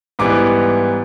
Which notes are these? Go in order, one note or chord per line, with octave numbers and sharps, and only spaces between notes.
G#2 E3 G3 B3 D6